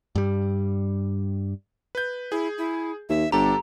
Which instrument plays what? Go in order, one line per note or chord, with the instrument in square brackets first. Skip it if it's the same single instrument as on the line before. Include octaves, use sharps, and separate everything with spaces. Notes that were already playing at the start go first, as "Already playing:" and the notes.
[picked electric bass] G2 G3
[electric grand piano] B4 G6
[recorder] E4 [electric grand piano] G#4
[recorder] E4
[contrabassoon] D#2 [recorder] E5
[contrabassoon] G1 [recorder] D4 [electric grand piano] G4 A4 [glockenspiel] A#5